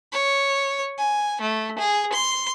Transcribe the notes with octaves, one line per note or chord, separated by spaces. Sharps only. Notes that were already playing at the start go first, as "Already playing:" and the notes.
C#5
G#5
A3
G#4
C6